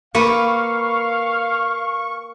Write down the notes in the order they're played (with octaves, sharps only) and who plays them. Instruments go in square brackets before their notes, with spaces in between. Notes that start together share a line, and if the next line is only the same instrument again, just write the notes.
[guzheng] A#3 B4 [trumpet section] F5 [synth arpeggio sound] C#6